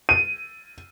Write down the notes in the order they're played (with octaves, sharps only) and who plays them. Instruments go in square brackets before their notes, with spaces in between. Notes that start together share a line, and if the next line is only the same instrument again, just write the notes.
[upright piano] D#7